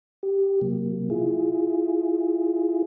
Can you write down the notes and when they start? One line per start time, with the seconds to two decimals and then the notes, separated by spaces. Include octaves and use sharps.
0.23 G4
0.61 C3 F#3 A#3
1.10 E4 F4 G#4